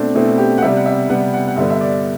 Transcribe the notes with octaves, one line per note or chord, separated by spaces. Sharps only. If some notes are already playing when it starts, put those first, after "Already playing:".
Already playing: B2 A3 C4 D4
B2 A3 C4 E4
G4
F#5
C3 G3 B3 E5
F#5
E5
C3 G3 B3 F#5
F#5
F#5
G2 D3 G3 B3 E5
E5
D5